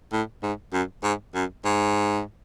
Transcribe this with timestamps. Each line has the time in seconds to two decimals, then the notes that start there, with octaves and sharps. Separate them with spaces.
0.13 A2
0.43 G#2
0.73 F#2
1.04 G#2
1.35 F#2
1.65 G#2